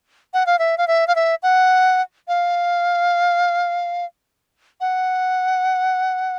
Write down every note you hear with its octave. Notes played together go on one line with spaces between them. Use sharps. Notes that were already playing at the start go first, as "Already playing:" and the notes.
F#5
F5
E5
F5
E5
F5
E5
F#5
F5
F#5